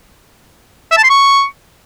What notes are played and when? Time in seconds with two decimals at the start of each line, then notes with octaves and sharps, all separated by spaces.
0.91 E5
0.97 A5
1.03 C6
1.10 C#6